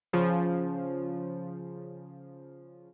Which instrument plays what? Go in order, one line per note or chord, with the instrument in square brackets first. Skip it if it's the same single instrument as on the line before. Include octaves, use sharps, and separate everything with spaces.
[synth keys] C#3 F3